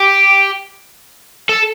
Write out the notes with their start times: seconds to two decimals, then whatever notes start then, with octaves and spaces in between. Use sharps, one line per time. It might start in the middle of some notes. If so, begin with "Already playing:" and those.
Already playing: G4
1.49 A4